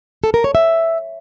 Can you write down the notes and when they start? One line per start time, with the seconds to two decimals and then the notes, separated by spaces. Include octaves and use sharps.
0.24 A4
0.34 A#4
0.44 C#5
0.55 E5